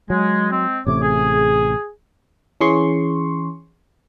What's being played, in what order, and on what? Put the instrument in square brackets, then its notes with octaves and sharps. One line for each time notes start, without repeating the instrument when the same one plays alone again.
[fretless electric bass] F#3 [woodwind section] G#3
[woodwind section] G#3 C4
[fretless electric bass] A1 C3 A3 [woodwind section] C#5 D6
[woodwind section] G#4
[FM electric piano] E3 C#4 G#4 C6 C#6